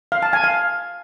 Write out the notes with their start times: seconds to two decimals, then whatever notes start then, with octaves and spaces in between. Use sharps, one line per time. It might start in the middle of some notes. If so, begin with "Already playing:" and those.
0.12 F5
0.23 A5
0.33 G#5
0.44 F5